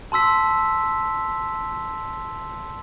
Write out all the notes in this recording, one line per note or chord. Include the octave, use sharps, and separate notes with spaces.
A5 C6 E6 B6